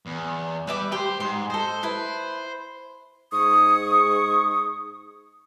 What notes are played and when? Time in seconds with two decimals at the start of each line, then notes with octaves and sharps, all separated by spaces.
0.06 E2
0.67 G3 B4 E5 D6
0.92 G4 B4 C5 G5
1.20 G#2 C6
1.50 A4 C5 D#5
1.83 E4 B4
3.32 G#2 G#4 C#6 D#6